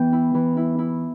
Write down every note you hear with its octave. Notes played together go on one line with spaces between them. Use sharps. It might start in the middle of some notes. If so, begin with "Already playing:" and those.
Already playing: E3 B3 G5
E4
E3
E4
E4